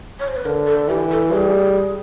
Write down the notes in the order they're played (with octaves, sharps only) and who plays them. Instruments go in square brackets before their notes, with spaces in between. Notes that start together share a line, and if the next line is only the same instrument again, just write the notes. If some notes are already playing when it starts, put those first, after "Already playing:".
[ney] C#5
C5
B4
[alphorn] D3 [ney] A#4
[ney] A4
[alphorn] E3 [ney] G4
[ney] A4
[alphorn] G3 [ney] G#4